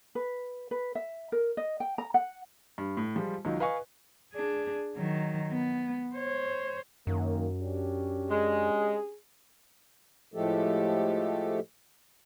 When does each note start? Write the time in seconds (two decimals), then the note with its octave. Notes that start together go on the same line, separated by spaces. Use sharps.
0.15 B4
0.71 B4
0.95 E5
1.32 A#4
1.57 D#5
1.80 G5
1.98 A#5
2.14 F#5
2.78 G2
2.97 A2
3.16 F3 G3 G#3 F4
3.45 C#2 D#3 F#3
3.60 B4 D#5 F5 G#5 C#6
4.33 D4 G#4
4.96 D#3 F#3
5.51 B3
6.15 C5 C#5
7.07 F#2 D#3 A#3
7.61 C#4 D4 G4
8.30 G#3 G#4
10.34 A2 F3 G#3 A3 G4 A4